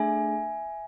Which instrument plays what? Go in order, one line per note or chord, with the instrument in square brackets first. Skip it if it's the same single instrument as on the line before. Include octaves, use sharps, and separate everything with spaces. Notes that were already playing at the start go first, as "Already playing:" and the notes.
Already playing: [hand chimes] A3 D4 G#4 E5 G#5